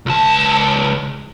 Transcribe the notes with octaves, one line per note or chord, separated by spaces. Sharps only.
C#2 A5